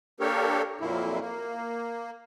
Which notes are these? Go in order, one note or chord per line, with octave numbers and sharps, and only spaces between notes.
A#3 D4 G4 A4 A#4 C#5
F2 A#2 F#3 A#3 E4
A#3